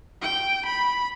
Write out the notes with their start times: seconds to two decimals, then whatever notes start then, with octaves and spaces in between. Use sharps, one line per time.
0.22 G5
0.66 B5